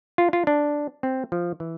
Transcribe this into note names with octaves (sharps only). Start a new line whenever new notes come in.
F4
F4
D4
C4
F3
E3